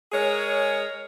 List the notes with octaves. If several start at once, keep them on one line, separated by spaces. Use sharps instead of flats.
G#3 G#4 A#4 C#5